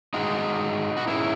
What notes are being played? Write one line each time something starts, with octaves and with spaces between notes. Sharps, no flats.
G#2 D#3 G#3 D#4 F#4
F#4
G#2 D#3 G#3 C#4 E4